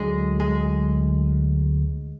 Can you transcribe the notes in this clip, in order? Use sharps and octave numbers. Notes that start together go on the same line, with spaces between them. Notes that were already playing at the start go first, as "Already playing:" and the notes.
Already playing: D2 D3 F#3 G#3 G#4
G#3 G#4